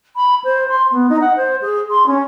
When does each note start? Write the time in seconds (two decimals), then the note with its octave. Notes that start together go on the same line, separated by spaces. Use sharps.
0.16 B5
0.44 C5
0.68 C6
0.91 B3
1.09 D#4
1.21 F#5
1.36 C5
1.62 G#4
1.90 C6
2.07 C#4